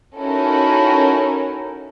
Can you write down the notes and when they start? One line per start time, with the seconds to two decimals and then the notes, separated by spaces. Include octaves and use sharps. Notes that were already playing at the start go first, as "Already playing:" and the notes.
0.15 C#4 D#4 E4 F#4 A4 A#4